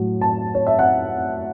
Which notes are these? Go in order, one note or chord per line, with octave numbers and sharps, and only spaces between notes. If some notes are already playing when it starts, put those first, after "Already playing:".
Already playing: A2 F#3
A5
C#5
E5
F#5